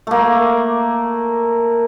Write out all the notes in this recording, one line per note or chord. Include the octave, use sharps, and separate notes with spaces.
A3 A#3